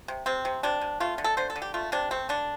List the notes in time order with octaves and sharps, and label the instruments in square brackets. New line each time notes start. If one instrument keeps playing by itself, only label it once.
[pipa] C3
C3 C4
C3
C3 D4
C3
A3 F4
D3
A4
D3 C5
A4
D3
G4
A3 F4
C3 D4
A3 C4
D3 D4